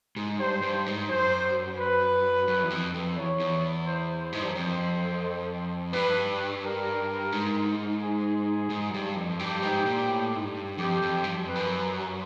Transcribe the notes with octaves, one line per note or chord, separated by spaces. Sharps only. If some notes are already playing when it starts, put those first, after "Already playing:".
G#2
G2 C5
G2
G#2
F#2 C5
B4
F#2
E2
F2
F2
E2 C#5
E2
C5
C5
G#2
G2
F#2
F2 C5
G2 B4
A#4
G#2
G#4
G#2
F#2
G2
F2
G2 G4
G#2
A#2
A2
G#2
G2
F2 G4
F2
G2
F#2
F2 B4
F#2